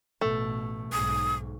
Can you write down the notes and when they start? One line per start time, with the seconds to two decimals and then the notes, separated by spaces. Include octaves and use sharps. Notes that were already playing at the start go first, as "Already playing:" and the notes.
0.21 A1 B2 A3
0.92 B1 G#2 D#6